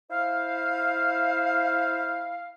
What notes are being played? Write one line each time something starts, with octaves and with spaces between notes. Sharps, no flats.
E4 C5 F5